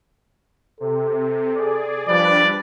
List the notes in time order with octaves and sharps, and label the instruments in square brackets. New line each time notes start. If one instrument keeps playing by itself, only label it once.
[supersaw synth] C3 [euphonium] A4
[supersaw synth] G#4 D5
[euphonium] F3 [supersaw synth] G3 D4 B4 [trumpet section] D5